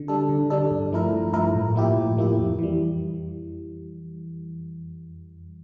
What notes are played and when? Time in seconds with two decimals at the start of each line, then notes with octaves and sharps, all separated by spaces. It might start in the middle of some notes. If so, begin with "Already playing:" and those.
Already playing: D3
0.08 G3 D4 A4
0.29 D3
0.50 G3 D4 A4
0.71 G2
0.92 F3 A3 E4 A#4
1.12 G2
1.33 F3 A3 E4 A#4
1.55 A2
1.75 F3 A#3 E4 G4
1.96 A2
2.17 F3 A#3 E4 G4
2.38 F2
2.59 E3 G3